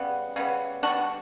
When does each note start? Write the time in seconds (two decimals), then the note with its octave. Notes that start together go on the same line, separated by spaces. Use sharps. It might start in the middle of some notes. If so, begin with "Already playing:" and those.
Already playing: C#3 G3 B3
0.36 C#3 G3 B3
0.83 D3 G3 B3 D4 F#4